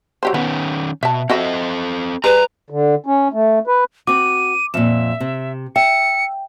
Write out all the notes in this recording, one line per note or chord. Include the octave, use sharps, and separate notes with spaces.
F#3 G4 C5
D#3 B3 C#4
B2 E5 A5
C4 F#4 A4 C5 D#5 E5
G3 G#4 B4 A#5
D3
C#4
A3
B4
C4 F#4 D6 D#7
F2 A#2 E5 E7
C3
E5 G5 C#7